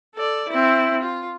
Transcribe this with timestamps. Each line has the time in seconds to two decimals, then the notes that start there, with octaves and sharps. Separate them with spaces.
0.15 A4 D5
0.49 C4 E4
1.02 F4